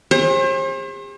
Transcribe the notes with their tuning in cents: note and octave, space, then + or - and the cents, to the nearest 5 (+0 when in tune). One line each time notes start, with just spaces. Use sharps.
G#4 -45 C5 +40